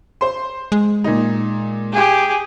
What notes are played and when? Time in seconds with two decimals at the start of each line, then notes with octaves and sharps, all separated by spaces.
0.21 C5 C6
0.72 G#3
1.04 A#2 D#4
1.92 G4 G#4